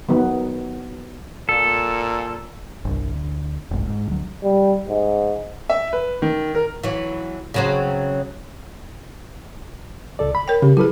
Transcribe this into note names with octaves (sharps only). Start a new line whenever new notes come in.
D#3 F#3 B3
A#2 A4
G1 C2
D2
F1 C2 G#2
G#2
D2 F#3
G3
G#2
E5
B4
D#3
A#4
E3 F#3
C#3 F#3 C4
C#2 A4 D5
B5
A#4 C#5 G5
C#3 G4
F#3 E4 G#4 A4 B4